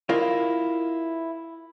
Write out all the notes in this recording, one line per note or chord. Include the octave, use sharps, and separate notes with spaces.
E4 F4 A#4 D#5 F5